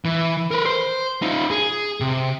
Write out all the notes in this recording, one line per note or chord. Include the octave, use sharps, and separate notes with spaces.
E3
A#4 B4
C5
D#4 F4
G#4
C3